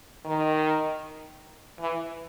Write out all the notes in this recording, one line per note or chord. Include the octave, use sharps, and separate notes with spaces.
D#3
E3